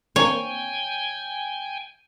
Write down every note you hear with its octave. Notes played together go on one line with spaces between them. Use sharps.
A#3 C4 D4 C#5 G5 G#5